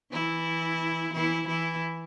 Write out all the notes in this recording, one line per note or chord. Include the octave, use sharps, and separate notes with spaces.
E3 E4
E3 E4
E3 E4